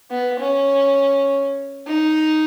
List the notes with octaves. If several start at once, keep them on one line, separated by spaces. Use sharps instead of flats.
B3
C#4
D#4